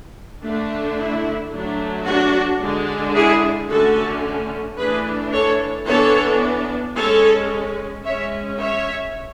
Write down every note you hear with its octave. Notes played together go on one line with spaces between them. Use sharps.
D3 A3 D4
E4
F#3 A3 D4
D4 F#4
D3 G#3 D4
E4 G#4
D3 A3 C#4 F#4 A4
E3 A3 D4 G#4 B4
A4 C#5
E3 B3 D4 A4 C#5
G#3 C#4 A4 C#5
G#3 C#4 C#5 E5
C#5 E5